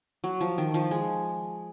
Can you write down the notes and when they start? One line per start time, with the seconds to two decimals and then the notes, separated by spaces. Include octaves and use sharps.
0.24 F#3
0.41 F3
0.58 D#3
0.74 F3
0.91 G#3